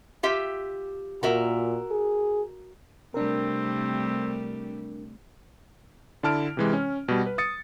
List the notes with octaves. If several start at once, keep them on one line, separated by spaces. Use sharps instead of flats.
F4 G4 E5
A#2 F#4 A#4 E5
G#4
C3 G3 A3 C4 D4 A#4
D3 E4 A5 F6 D7
C3 E3 G#3
C#4
B2 G3
B4
D#6 A6 C#7